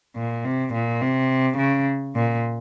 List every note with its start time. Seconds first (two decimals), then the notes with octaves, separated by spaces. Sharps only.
0.16 A#2
0.45 C3
0.73 A#2
1.02 C3
1.58 C#3
2.15 A#2